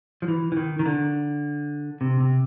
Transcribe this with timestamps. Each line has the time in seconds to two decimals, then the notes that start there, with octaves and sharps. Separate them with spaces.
0.22 F3
0.28 E3
0.52 E3
0.57 D#3
0.79 D#3
0.86 D3
2.01 C3
2.21 C3